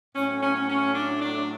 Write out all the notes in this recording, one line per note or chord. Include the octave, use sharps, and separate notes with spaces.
A2 F#3 A3 C#4
C#4
C#4
C#4
C#4
D4
D4